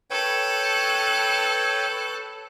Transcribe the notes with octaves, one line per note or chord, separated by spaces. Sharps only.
A4 B4 C#5 G5 F#6